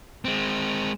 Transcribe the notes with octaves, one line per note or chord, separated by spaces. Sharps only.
G#3 C4